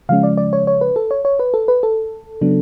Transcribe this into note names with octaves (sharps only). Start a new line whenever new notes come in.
C#3 F3 G#3 C#4 F5
D5
D5
C#5
C#5
B4
A4
C#5
C#5
B4
A4
B4
A4
C#3 F#3 B3 D4